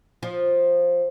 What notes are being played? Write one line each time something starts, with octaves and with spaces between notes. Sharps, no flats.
F3